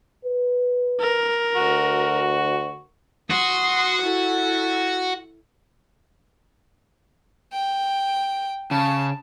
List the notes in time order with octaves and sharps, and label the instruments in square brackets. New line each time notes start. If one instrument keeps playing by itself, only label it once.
[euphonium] B4
[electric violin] A#4
[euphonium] D2 [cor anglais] F#4
[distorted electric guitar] F#4 [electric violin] C6 D#6
[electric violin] E4 A4
[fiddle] G5
[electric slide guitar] C#3 [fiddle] A5